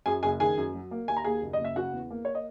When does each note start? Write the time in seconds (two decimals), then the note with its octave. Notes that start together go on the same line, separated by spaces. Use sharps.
0.06 F#2 G#4 G#5
0.23 F#1 G#4 G#5
0.40 D#3 G#4 G#5
0.57 F#2
0.74 F#3
0.91 A#3
1.08 D#2 G#5
1.17 A#5
1.24 D#2 G#4 G#5
1.42 F#1
1.53 D#5
1.59 F#1
1.65 E5
1.76 C#3 F#4 F#5
1.93 E2
2.10 A#3
2.25 C#5
2.35 D#5